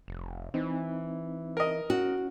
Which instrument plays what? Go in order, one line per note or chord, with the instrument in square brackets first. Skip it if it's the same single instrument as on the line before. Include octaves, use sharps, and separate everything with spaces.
[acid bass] F1
[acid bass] E3 [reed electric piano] C4 D#4
[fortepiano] A#4 D#5
[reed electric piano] C#4 [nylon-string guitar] F#4